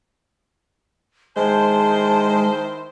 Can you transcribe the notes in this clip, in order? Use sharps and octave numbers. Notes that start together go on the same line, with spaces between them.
D#3 G#3 E4 C5 A5